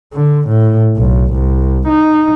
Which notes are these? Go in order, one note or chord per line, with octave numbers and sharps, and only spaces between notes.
D3
A2
B1
C2
D#4